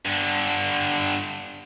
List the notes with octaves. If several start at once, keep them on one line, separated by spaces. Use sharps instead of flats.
G2 D3